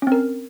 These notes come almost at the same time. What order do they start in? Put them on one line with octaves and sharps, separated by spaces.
C#4 C4 A#4